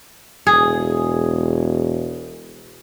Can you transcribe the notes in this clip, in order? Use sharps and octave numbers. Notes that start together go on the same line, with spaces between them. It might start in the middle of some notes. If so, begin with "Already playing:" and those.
E1 G#4